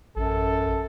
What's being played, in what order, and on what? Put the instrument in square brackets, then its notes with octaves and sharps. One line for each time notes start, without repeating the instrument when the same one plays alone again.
[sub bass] A1 [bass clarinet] F#2 [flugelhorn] A4